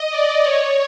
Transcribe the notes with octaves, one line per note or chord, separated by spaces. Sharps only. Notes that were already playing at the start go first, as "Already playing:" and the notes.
Already playing: D#5
D5
C#5